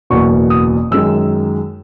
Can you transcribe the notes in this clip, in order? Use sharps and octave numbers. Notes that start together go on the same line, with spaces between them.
F#1 E2 B2 C#6
D#6
F#2 D#3 G#3 E6